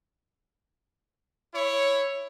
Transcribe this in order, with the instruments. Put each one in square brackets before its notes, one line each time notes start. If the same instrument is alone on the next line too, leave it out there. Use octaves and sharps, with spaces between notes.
[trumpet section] E4 C#5